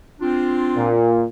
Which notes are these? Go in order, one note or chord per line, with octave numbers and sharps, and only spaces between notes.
C4 D4 F4
A#2